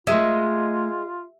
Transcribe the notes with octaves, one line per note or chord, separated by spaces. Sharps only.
G#3 A3 F4 A#4 D#5 E5